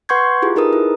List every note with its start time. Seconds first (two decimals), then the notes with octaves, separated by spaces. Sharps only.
0.09 B4 F#5 C6 C#6 G6 G#6
0.42 E4 F4 G4 G#4
0.56 D#4 G#4 A#4 B4 D#6
0.73 E4